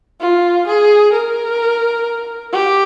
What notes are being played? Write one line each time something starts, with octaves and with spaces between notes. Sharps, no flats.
F4
G#4
A#4
G4